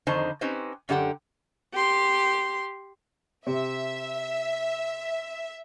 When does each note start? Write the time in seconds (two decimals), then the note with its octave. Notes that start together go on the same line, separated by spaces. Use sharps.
0.07 F2 D3 D#3 D#4 C5 A5
0.41 C4 C#4 D#4 G4 B4 C5
0.89 F#2 D3 G4 F#5 G5
1.74 G4 C6
3.47 C3 E5